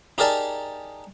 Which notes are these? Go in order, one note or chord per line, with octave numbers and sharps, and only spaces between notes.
D#4 G4 G#4 A#4 D5 A5